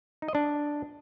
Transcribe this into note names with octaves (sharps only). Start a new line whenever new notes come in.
D#4
D#5
D4